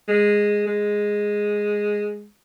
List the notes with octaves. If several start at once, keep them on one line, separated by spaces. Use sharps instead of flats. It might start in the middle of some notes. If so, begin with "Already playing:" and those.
G#3
G#3